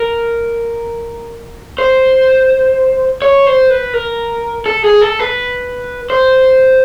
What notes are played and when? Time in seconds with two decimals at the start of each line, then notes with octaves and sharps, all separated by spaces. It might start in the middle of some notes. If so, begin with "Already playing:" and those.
Already playing: A#4
1.78 C5
3.22 C#5
3.46 C5
3.70 B4
3.94 A#4
4.66 A4
4.84 G#4
5.01 A4
5.19 B4
6.10 C5